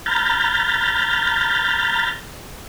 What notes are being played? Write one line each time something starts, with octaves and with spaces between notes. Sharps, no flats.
A#5 B5 F6 G6 A6